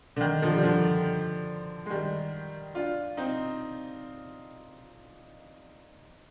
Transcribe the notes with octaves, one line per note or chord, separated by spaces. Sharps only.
D3
D#3
D3 F3
G3
D3 F3
G#3
D#3 G3
D4 F4
C4 D#4